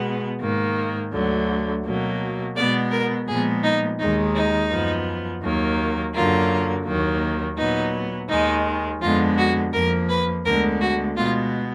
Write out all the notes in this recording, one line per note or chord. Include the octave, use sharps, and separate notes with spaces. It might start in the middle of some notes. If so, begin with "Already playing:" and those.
Already playing: B2 G#3 B3
G#2 D#3 A#3
D2 D3 F#3
B2 F#3 A#3
B2 G#3 B3 D5
A#4
A#2 F3 G#3 B3 G#4
D#4
D#2 D#3 G#3 D#4
D#4
F#2 F3 B3
D#2 D#3 F#3 A#3
F#2 D3 F#3 A#3 F4
D#2 D#3 F#3 A#3
A#2 F#3 B3 D#4
D#2 D#3 G#3 D#4
F2 D3 G#3 B3 F4
F#4
F2 F3 A#3 A#4
B4
D2 D3 G#3 B3 A#4
F#4
B2 G#3 B3 F4